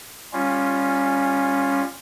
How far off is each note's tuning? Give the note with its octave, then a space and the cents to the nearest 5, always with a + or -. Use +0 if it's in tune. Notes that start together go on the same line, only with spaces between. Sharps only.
G3 +20 C#4 -5 F4 +5